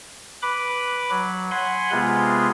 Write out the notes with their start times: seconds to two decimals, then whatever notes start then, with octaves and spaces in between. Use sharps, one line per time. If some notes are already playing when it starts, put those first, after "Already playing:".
0.42 B4 B5 D6
1.10 F#3
1.51 F#5 G#5 B5 C6
1.92 C3 G#3 B3 F4 G#4